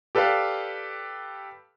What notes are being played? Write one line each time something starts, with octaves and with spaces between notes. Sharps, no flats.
G4 A4 B4 D5 F5